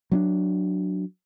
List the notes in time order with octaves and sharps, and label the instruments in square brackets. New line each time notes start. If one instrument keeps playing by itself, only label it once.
[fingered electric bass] F#3 C#4 D4